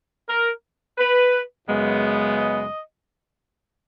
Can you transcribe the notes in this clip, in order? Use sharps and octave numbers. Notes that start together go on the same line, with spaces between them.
A#4
B4
F#2 C#3 G#3 B3
D#5